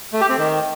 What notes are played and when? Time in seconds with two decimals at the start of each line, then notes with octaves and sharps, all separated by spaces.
0.13 A3
0.21 G4
0.29 C4
0.38 D#3